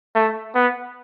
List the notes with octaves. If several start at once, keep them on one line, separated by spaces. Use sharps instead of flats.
A3
B3